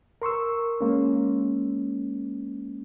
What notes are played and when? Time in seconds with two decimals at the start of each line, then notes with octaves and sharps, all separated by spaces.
0.22 A#4 C6 C#6 E6
0.81 G#3 A#3 C#4